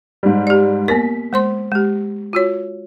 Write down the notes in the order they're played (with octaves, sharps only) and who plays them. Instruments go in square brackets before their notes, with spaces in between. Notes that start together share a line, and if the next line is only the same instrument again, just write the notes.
[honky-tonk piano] G#2 G3
[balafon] G4 D5
[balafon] A#3 B3 A#4 [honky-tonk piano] B6
[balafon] G#3 C5 C6
G#3 G4
F4 F#4 C#5